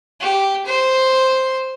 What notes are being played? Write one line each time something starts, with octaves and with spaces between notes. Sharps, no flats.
G4
C5